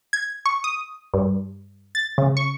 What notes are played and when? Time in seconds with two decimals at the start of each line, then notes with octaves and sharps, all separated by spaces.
0.13 G#6
0.46 C#6
0.64 D#6
1.14 G2
1.95 A6
2.18 C#3
2.37 C#6